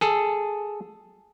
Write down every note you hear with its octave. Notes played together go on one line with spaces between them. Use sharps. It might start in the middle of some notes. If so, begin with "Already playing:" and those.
G#4 A4